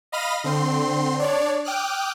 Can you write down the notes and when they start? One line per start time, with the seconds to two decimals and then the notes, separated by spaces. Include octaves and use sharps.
0.12 D#5 F5 B5 F6 A#6 D#7
0.44 D3 C4 C6
1.19 D4 C#5 D5
1.65 G5 D6 D#6 F6 F#6